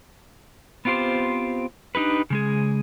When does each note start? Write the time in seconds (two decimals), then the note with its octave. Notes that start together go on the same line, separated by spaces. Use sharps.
0.85 B3 C4 F4 G4 C5
1.95 D4 D#4 G4 B4
2.30 C#3 G#3 G#4